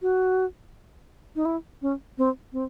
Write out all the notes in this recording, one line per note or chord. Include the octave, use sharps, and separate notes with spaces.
F#4
D#4
E4
C#4
C4
C4